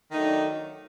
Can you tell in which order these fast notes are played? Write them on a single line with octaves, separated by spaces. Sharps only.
D#3 D#4 A3 F#3 D4